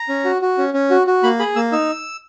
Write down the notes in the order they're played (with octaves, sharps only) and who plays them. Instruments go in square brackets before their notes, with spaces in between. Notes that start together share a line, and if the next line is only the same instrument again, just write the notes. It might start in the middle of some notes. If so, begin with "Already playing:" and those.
Already playing: [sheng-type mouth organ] A#5
C#4
F#4
F#4
C#4
C#4
F#4
F#4
A#3 B5
G#4 B5
A#3 E6
D#4 E6